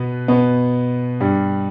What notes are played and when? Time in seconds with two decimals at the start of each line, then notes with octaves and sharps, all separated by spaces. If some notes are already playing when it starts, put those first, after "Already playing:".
Already playing: B2 B3
0.28 B2 B3
1.20 G2 G3